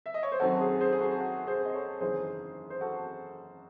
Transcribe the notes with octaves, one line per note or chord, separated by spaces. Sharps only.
E5
D#5
C#5
C5
F#2 D#3 F#3 C4 F#4 A4
G#4
G#4 C5
G#4
F#4 A4
F#4
G#4 C5
D#5
A4 C#5
F#1 E2 D#3 G#4 C5
C5
F#4 A4